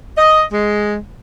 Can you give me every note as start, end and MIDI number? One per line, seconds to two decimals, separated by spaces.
0.17 0.42 75
0.51 0.95 56